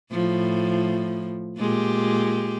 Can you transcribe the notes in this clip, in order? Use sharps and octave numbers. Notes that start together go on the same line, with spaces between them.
A2 F3
A#2 G#3 G4